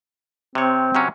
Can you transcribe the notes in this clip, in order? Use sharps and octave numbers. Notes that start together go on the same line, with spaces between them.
C3 C4 C#5
C3 F#3 C#4